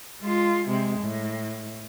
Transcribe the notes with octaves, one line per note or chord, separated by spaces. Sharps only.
G#3 F4
C3 G#3
A2